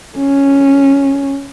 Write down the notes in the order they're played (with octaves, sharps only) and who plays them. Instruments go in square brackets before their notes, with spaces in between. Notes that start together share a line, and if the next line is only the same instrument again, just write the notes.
[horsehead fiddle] C#4